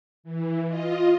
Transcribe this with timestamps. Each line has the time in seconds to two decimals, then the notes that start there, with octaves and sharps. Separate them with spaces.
0.23 E3
0.66 F4 D#5